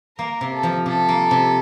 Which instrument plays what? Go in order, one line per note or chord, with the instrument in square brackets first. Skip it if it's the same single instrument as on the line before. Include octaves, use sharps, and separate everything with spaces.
[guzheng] A#3 [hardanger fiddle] A#4
[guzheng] C3
[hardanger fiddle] A4
[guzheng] F3
[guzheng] C3 [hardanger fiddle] A4
[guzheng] A#3
C3